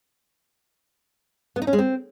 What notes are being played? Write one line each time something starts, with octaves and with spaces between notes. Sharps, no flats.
B3
D#4
C#4
G#3
C4